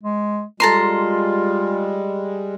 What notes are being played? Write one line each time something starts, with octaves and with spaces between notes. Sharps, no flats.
G#3
G3 G#3 F4 A4 A#5 C6